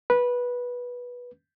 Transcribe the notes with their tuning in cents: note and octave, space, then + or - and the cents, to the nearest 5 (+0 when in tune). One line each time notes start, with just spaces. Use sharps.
B4 -15